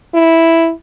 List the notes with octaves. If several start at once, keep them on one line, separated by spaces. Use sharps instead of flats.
E4